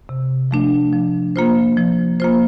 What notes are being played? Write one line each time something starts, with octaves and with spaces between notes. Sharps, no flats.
C3
F3 A3 D4
F3
A#3 F4 C5
F3
A#3 F4 C5